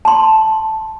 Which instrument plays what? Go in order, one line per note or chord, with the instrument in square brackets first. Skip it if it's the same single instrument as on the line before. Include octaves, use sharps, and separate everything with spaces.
[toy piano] A5 C6